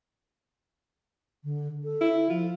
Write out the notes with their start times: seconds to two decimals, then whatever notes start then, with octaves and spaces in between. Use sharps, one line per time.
1.44 D3
1.84 A4
2.01 E4
2.30 F3 F4